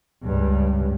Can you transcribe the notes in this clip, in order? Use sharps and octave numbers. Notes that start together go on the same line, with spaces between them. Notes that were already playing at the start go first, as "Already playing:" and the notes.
C#2 G2